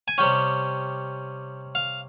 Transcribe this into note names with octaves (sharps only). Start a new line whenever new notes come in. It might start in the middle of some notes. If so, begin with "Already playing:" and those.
G#5
C3 G3 C#4 G5
F5